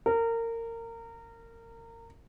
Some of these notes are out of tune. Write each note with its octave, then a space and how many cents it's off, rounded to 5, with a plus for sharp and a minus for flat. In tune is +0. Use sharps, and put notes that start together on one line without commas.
A#4 -25